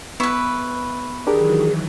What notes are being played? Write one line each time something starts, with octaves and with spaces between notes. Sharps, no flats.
B3 E4 B4 C#6
D#3 E3 F#3 D4 G4 G#4 A#4